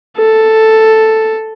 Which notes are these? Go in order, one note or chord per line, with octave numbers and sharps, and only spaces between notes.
A4